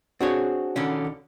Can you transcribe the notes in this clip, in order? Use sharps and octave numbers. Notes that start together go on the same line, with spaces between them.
C4 D4 F#4 G#4 C#5
D3 D#3 C#4